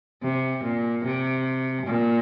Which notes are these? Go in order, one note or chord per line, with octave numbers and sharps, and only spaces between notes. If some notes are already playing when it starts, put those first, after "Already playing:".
C3
A#2
C3
A#2